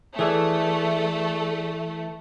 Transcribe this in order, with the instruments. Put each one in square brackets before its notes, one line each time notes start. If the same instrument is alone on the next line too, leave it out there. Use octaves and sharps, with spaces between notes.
[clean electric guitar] E3 [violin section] A3 [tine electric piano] G#4 A4 D5